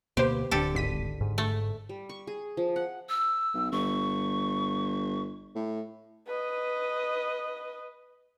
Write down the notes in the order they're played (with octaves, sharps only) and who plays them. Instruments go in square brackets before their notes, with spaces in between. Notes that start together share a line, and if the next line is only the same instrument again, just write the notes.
[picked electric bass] D2 B2 A#3 [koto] G4 [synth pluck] B4 C5
[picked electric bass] D1 [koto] D3 G4 A4
[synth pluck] G#1 B6 D#7
[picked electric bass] G#2
[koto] A3
[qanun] G3
C#6
G#4
F3
F#5
[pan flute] E6
[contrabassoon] B1
[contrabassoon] G1 [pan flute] C#6
[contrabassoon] A2
[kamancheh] B4 D#5